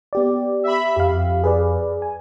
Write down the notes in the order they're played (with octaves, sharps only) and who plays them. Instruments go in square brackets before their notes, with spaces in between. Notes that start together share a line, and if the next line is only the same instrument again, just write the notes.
[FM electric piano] B3 G4 D5
[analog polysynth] E5 B5
[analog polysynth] F2 [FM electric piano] G4 F5
[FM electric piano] G#4 B4 D5
G#5